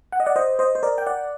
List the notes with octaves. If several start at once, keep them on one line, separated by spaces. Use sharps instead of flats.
F#5
D#5
D5 F#5
C5 D#5
C5 D#5
C5
A#4 D5
G5
D5 F#5